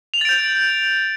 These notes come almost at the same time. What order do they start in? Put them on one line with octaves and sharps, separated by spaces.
F7 F#7 A6 D7 G6